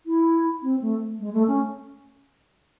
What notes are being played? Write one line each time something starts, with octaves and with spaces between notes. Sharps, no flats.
E4
C4
A3
G#3
A3
C#4